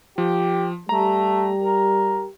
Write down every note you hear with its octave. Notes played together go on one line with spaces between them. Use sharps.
F3 G4
G3 A3 G4 A#5
A#4